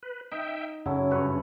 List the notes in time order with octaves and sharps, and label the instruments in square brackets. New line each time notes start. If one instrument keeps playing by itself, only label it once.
[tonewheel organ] B4
[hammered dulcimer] D#4 [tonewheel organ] E5 G5
[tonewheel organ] F#2 C#3 C#4 [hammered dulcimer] F#3 E4 A4
[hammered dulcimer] G2 B4 C#5